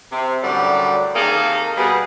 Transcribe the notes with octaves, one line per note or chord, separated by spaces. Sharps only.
C3
F#2 A2 D3 F#3 G3 D5
C3 D#3 A#3 G#4 A4 F5
B2 G3 B3 G#4